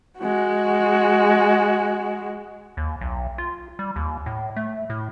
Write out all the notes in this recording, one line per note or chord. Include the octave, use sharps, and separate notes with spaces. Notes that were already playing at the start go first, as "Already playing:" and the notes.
G#3 F#4
D#2
B1
F4
G3
D#2
A2
A3
A2